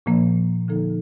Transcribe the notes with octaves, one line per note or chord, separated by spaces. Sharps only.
A#2 F3 A#3
D3 F3 A#3 D#4 A4